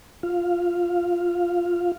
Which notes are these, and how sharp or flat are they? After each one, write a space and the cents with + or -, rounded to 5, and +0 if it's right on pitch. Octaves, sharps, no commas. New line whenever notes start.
F4 +0 F5 -5